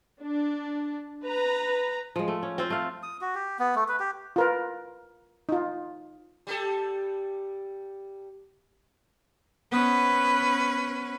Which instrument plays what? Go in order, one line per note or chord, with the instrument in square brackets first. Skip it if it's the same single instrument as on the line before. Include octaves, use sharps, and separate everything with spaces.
[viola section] D4
B4 A#5
[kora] F3 G#3
A3
C#4
C4 F4 C5
A3 F5
[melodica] D#6
F#4
G4
B3
A3
B4
G4
[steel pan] F4 A#4 B4
D#4 F4
[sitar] G3 G4 A4
[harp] B3 C5 D#6 [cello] C#4 B4